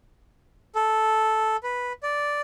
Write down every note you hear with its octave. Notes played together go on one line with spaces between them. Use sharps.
A4
B4
D5